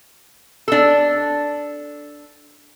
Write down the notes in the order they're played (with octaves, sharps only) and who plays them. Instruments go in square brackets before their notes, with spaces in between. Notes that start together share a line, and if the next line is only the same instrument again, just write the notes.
[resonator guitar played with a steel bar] D4 A4